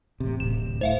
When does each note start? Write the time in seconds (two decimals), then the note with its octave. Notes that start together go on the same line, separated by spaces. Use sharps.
0.20 A1 C3
0.40 D1 E7
0.81 A2 C5 E5 F5